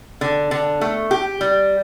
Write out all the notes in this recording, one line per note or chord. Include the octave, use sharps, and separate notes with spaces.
D3
D3
A3
G4
G3